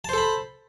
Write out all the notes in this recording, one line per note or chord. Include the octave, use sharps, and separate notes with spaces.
A4 C5 A5 B5